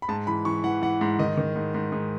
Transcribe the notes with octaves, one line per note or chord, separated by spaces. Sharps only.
B5
G#2 A5
E3 B5
E3 C#6
E3 F#5
E3 F#5
G#2
D#3 D#5
D#3
G#2
G#2
G#2